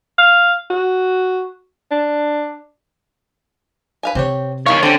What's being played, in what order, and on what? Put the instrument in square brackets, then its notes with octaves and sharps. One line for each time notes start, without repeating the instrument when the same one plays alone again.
[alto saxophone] F5
F#4
D4
[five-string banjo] B4 F5 G#5
[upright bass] C3 [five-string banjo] C4 G4 C#5
[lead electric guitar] D#3 C#5 [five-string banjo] E4 A#4 F5
[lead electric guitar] D3 [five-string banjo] C4 C#4 G4